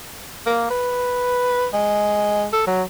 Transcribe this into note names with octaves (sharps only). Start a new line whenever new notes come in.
A#3
B4
G#3
A4
F#3